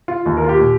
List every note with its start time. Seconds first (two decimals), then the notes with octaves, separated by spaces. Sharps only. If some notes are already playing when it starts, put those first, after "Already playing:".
0.08 F4
0.26 D#2 D#3
0.37 A#4
0.44 F4
0.49 G4
0.60 A#2